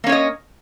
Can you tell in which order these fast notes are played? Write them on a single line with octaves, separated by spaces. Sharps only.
A#3 C#4 C#5 D#5